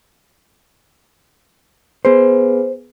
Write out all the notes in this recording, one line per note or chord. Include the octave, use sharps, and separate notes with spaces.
B3 G#4 B4 C5